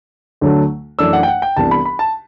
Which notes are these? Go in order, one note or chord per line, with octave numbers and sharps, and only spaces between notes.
D2 D3 F#3 A3
F#2 E3 A3 D4 E6
F#5
G5
F#5
G5
C2 C3 E3 B3 D4 A5
B5
B5
A5